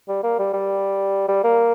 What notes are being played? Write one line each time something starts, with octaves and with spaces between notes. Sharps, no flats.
G3
A#3
G3
G3
G3
A#3